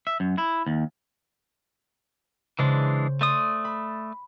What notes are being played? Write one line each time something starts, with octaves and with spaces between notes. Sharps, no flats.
E5
F#2
E4
D#2
C#3 E3 G#3 D4 C5
A3 D5 C6 D#6
B5